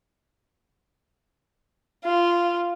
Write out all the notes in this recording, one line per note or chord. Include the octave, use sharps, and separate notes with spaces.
F4